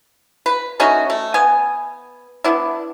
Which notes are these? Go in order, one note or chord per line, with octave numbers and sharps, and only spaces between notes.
B4
A3 C#4 D#4 F#4
A3
B3 G#5
B3 D4 E4